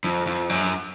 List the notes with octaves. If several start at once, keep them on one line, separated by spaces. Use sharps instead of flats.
F2
F2
F#2